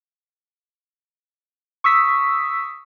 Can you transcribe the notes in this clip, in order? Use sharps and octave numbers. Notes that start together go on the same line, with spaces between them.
C#6 D#6 E6 B6